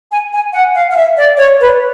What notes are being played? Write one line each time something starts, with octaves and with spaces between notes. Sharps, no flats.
G#5
G#5
F#5
F5
F5
E5
D5
C#5
B4